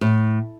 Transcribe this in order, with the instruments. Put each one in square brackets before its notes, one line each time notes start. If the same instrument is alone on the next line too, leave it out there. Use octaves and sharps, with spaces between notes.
[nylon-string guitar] A2